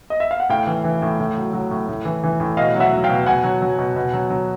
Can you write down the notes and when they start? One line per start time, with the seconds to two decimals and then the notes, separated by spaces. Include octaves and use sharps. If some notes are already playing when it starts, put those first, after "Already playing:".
0.10 D#5
0.20 E5
0.31 F5
0.40 F#5
0.49 A2 F5 G5
0.67 E3
0.84 E3
1.02 A2
1.20 A2
1.37 F#3
1.53 F#3
1.71 A2
1.89 A2
2.05 E3
2.24 E3
2.40 A2
2.57 B2 D#5 F5
2.75 F#3
2.80 E5 F#5
2.92 F#3
3.04 F5 G5
3.09 B2
3.26 B2 F#5 G#5
3.44 F#3
3.62 F#3
3.78 B2
3.96 B2
4.13 F#3
4.30 F#3